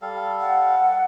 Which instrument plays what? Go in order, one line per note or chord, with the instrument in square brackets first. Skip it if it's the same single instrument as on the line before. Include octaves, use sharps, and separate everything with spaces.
[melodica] G3 A4 F5
[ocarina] F#5